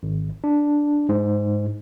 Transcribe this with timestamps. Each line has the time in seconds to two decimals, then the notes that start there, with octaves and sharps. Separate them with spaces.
0.03 G#1
0.44 D4
1.09 G#2